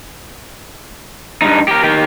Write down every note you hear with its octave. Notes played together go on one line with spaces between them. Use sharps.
G2 D#4
G4 A#4
D#3 G4